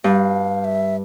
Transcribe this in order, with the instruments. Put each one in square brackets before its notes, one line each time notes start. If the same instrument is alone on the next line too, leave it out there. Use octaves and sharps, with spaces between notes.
[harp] G2 [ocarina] F5
[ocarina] E5